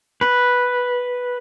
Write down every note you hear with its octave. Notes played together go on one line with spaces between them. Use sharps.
B4